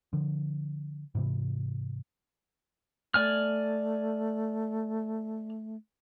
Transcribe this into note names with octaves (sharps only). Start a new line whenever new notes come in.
D3 F3
G#2 C3 E3
A3 D5 G#5 F6